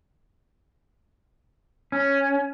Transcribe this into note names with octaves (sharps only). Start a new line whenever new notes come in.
C#4